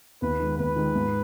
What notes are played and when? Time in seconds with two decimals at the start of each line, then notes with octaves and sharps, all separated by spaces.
0.22 D#2 B4
0.40 D#3 G#3
0.58 D#2 B4
0.76 D#3 G#3
0.95 G#2